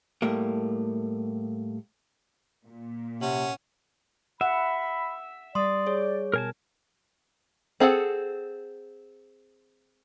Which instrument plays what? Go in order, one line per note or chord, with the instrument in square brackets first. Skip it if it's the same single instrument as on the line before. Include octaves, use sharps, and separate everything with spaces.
[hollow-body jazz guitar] A2 G3 A3 A#3
[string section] A#2
[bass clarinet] C3 [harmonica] C#4 [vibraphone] F#5
[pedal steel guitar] E5 [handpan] F#5 [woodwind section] B5
[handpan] G3 [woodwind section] D5 [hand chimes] C6 D#6
[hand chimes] G#4 C#5
[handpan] B2 [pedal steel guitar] A#4 G#5 A5
[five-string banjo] C4 G#4 A4 F#5